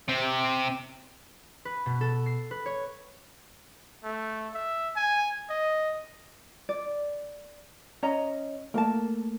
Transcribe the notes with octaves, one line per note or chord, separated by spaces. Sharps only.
C3 C4
B4
B2
A4
C7
B4
C#5
A3
E5
G#5
D#5
D5
C#4 D#5 A#5
A3 A#3 A#4 A5